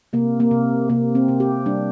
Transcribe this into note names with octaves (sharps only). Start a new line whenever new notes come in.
C3 A#3
A#3
C3
C3 A#3
C4
C3
G4
G3 D4